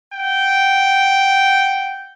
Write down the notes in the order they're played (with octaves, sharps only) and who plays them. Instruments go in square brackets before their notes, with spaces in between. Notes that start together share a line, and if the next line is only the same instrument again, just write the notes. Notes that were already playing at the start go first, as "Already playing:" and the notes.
[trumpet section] F#5 G5